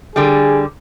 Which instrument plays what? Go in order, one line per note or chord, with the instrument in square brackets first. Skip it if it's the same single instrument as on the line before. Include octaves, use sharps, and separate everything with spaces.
[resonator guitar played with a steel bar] D3 G3 [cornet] G#4